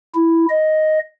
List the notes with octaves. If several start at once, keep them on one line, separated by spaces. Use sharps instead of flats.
E4
D#5